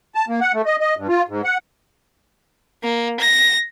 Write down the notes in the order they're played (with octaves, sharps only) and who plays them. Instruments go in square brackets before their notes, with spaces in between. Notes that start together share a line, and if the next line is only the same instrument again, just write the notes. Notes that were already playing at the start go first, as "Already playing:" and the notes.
[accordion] A5
A#3
F#5
A3
D#5
D#5
G2
F4
G#2
F#5
[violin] A#3
A#6